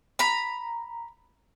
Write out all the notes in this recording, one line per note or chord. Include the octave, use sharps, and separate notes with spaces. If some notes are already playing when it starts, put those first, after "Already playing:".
A#5 B5